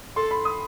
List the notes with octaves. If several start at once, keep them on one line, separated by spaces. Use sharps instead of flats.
A4 C6
B5
D#6